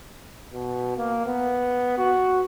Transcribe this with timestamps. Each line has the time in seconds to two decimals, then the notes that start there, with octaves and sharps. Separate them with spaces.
0.53 B2
0.97 A#3
1.27 B3
1.98 F#4